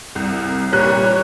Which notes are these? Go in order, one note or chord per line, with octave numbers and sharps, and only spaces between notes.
C2
A#2 G3 C#5 F#6